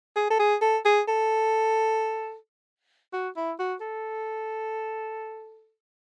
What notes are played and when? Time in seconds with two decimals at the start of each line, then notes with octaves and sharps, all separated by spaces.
0.16 G#4
0.30 A4
0.39 G#4
0.61 A4
0.85 G#4
1.08 A4
3.13 F#4
3.36 E4
3.59 F#4
3.81 A4